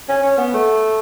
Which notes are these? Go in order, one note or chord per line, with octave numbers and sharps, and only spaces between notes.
C#4
C#4
B3
A3